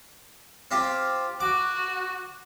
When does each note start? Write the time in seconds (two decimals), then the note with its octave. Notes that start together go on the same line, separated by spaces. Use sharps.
0.71 C4 F4 G4
1.40 F#4 D6